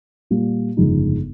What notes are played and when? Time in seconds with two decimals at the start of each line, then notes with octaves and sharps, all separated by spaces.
0.30 A#2 G3 A#3
0.77 G1 F2 C#3 G#3 D#4